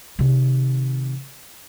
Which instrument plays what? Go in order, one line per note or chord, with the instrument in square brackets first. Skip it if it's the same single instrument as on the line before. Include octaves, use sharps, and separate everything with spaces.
[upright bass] C3 D#3